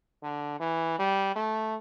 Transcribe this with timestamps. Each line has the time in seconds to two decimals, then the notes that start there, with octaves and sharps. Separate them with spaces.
0.23 D3
0.60 E3
0.98 G3
1.36 A3